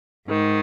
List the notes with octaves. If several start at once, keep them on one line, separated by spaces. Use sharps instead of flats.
G#2 D#3